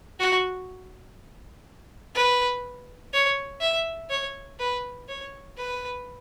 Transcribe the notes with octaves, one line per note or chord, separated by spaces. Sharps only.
F#4
B4
C#5
E5
C#5
B4
C#5
B4